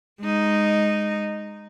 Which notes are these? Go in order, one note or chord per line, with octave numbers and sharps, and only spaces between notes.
G#3 D#4